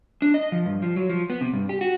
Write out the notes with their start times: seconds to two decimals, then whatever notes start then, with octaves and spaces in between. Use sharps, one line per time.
0.22 D4
0.34 D#5
0.52 F3
0.66 G2
0.82 F3
0.96 F#3
1.10 F3
1.30 B3
1.41 C3
1.53 G2
1.69 G4
1.81 F#4